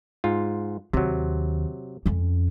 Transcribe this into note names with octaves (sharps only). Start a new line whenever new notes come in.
G#2 F4
D#2 C3 F#3
F2 C#4